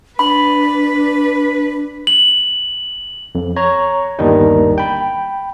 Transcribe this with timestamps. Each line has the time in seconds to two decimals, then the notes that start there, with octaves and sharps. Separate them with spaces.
0.19 D4 B4 B5
2.07 F#7
3.35 F2
3.56 C#5 A#5
4.19 G1 D#2 D#3 G3 D4 D#4
4.78 G5 B5